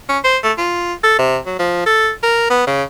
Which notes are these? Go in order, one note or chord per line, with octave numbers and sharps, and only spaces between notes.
C#4
C5
A3
F4
A4
C3
F#3
F3
A4
A#4
B3
C#3